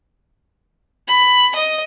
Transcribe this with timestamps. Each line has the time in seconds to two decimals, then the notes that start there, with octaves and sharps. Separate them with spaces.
1.08 B5
1.55 D#5